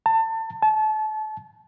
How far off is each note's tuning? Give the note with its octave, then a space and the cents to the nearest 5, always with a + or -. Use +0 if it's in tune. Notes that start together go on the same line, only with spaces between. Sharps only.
A5 +30
A5 -30